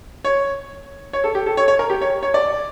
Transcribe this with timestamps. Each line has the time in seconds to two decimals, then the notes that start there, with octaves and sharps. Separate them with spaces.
0.25 C#5
1.13 C#5
1.24 A4
1.35 G4
1.46 A4
1.57 C#5
1.68 C#5
1.79 A#4
1.90 G4
2.01 C#5
2.23 C#5
2.34 D5